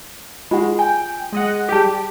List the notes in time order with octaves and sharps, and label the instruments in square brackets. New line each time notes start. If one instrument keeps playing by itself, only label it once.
[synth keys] G#3 [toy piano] F4 G4 F#5
[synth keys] G5 [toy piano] G#5
[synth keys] G#3 D#5 F#5
[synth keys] G3 G4 [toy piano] G#4 A5